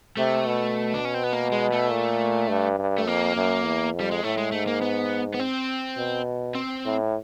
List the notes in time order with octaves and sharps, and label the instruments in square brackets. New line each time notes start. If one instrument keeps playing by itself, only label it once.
[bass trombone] C3 [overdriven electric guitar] A3
[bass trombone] B2
[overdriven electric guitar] D4
C#4
C4
B3
A#3
G#3
A3
[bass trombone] A#2
G2
G2
[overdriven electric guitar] A3
[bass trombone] F2 [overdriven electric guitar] A#3
[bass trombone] F#2
E2
F2
[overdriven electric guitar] G3
G#3
[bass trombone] A2 [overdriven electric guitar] A3
[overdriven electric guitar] G#3
[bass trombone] G#2 [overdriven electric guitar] A3
[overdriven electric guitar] A#3
B3
B3
C4
[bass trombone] B2
[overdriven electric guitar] C4
[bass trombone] A2